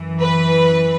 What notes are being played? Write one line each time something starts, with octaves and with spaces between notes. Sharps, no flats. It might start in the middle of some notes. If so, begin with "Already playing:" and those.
Already playing: F#2 E3
B4